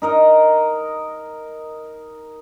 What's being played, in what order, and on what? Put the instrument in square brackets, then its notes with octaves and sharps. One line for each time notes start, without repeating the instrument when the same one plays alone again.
[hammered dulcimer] D#4 A#4 D#5